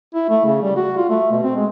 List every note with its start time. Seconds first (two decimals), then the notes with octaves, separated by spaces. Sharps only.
0.15 E4
0.30 A3
0.46 C#3
0.62 G3
0.76 F#4
0.97 F4
1.10 A3
1.32 B2
1.44 C4
1.56 G#3